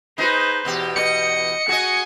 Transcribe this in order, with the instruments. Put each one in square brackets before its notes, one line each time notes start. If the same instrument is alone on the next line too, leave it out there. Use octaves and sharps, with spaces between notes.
[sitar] D#4 G#4 [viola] B4 C5
[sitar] E2 B2 G4
[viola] D#5 [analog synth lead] C#7
[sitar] F#4 G#4 D#5 [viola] G#5